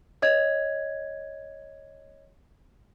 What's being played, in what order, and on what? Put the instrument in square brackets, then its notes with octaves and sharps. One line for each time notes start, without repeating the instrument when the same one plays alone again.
[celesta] C#5 D#5 G#6